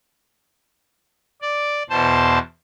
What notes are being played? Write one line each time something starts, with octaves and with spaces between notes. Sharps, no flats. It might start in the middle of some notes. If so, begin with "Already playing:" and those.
D5
E2 B2 C5 A5